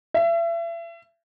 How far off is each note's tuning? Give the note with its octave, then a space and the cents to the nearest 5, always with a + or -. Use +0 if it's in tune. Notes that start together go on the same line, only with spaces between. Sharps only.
E5 +35